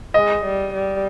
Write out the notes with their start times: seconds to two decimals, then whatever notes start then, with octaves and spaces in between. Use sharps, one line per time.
0.14 G#3 D#5
0.44 G3
0.74 G3